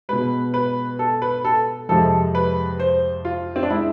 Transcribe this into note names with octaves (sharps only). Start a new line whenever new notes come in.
B2 G#3 B4
B4
A4
B4
A4
F2 C3 F3 G#3 A4
B4
C5
F4
C4
D4
G#3 E4